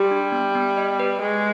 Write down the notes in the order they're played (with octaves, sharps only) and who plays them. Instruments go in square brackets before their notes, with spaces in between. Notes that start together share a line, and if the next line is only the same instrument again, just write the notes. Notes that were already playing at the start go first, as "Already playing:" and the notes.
Already playing: [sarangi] G3 [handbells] G4
[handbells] D4
B3
B3
D#5
B4
[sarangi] G#3 [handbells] G#4